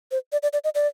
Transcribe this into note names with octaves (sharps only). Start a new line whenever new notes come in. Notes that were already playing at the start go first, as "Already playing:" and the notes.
C5
D5
D5
D5
D#5
D5